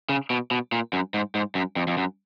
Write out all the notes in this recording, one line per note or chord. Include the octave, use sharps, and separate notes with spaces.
C#3
B2
B2
A#2
F#2
G#2
G#2
F#2
F2
F2
F#2